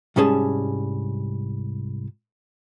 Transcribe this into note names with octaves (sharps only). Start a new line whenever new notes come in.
C2 G#2 G3 C#4 G#4 A5